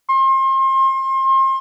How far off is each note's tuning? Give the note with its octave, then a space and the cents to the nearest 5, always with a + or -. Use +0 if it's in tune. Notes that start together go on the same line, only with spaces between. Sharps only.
C6 +35